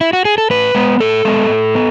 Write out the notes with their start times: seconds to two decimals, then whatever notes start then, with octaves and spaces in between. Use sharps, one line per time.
0.01 E4
0.13 F#4
0.25 G#4
0.38 A4
0.50 A2 B4
0.75 G#3 B3
1.00 A2 A4
1.25 G#3 B3
1.50 A2
1.75 B3